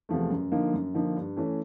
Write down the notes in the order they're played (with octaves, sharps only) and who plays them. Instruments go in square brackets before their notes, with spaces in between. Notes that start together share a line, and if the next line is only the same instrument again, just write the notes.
[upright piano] E2 C3 F3 A3
F#2
D3 F3 A#3 D#4
F#2
D3 F3 A#3 D#4
G2
E3 A3 C#4